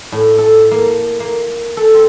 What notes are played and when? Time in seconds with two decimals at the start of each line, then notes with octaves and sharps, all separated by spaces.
0.12 A2
0.38 A4
0.71 A#3
1.20 A#3
1.77 A4
1.94 C4